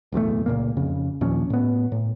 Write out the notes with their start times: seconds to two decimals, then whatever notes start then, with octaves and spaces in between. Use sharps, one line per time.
0.12 D1 B1 E2 A3
0.46 C#2 A#2 A#3
0.77 F2 C#3
1.21 D#2 A#2 F3 C#4
1.50 A2 B3
1.92 A2